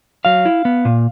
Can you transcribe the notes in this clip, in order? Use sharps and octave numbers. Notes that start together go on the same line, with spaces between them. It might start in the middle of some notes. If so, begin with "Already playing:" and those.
F#3 F5
E4
B3
A#2